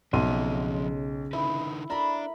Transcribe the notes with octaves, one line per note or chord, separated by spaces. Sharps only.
B1 C#3 F3 C4 E5 C6 D#7
D3 D#4 E4 B4
D4 A#4 A#5 B5